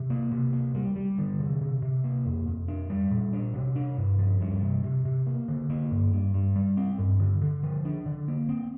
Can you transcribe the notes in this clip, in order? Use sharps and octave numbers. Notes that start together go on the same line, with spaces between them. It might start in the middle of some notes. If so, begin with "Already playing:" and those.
Already playing: C3
A#3
C3
A#3
G3
G3
D3
C3
C3
C3
A#3
F2
F2
D4
G3
A#2
D4
C3
D4
G2
F3
G2
C3
C3
C3
A#3
D3
A#3
G2
G2
G2
G3
C4
G2
D3
D3
F3
D4
D3
A#3
C4